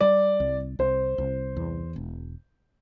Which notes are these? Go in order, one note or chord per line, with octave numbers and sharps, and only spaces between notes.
G3 D5
C2
C2 C5
C2
E2
E1